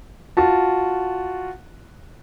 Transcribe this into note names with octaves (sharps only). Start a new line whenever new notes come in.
F4 F#4 A5